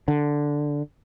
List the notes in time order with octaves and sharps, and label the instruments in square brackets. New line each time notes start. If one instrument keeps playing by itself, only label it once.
[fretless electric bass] D3